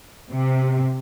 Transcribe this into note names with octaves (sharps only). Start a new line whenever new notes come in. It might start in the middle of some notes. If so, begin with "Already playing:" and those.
C3